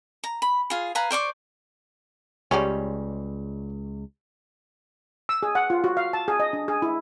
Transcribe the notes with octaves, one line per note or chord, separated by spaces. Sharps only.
A#5
B5
F4 G#4
B4 F5 G#5 A#5
C5 D5 C#6 D6
C#2 G3 G#3 C#4
E6
G#4
F#5
F4
F#4
F5
A5
G#4
D#5
D4
G#4
E4